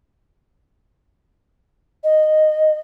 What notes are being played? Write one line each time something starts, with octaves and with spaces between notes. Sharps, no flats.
D#5